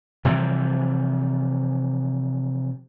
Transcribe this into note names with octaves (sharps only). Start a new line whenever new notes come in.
C3 E3 F3 G3